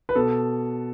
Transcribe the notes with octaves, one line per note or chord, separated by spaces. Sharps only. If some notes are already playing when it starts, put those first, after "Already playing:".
B4
B2 A4